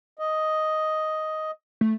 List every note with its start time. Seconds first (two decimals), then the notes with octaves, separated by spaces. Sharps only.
0.19 D#5
1.81 A3